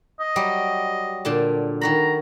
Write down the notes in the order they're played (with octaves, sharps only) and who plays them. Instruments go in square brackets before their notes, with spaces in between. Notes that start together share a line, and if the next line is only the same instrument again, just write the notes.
[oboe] D#5
[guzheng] F#3 G3 G4
A#2 D3 A5
[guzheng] D#3 F#4 B5 [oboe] A#5